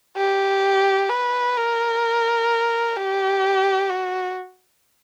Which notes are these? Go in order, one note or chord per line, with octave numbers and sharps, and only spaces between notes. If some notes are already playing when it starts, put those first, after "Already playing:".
G4
B4
A#4
G4
F#4